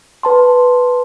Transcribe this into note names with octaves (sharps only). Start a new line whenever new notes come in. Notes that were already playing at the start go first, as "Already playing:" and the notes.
B4 A5 C6